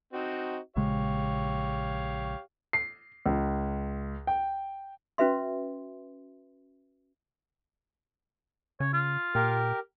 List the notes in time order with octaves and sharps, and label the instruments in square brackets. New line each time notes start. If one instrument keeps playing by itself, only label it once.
[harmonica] C4 D#4 F#4
[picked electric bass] A#1 C#3 G#3 [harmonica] G4 C#5 F5
[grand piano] C7
C#2
G5
[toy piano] C#4 F#4 B4 E5 C6
[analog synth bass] C#3 [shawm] C#5
[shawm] F4
[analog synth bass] A#2 [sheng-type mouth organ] G4 A#4